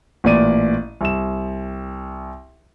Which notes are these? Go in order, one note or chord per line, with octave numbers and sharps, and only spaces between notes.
A1 A#2 D5 D#7
C2 E7